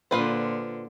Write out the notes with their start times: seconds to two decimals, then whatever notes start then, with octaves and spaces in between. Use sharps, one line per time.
0.11 A#2 D3 F4 B4 C5